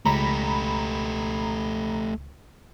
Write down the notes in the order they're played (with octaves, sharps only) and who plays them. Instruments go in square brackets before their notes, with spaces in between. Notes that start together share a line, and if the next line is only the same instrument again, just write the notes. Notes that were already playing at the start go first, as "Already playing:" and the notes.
[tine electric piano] C#2 [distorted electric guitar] A3 G4 [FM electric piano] A#5 B5